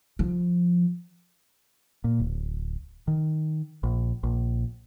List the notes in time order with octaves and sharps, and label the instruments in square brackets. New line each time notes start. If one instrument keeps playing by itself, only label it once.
[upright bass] F3
[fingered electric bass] A#2
D1
D#3
A#1
A#1